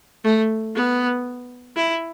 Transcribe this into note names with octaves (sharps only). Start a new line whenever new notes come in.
A3
B3
E4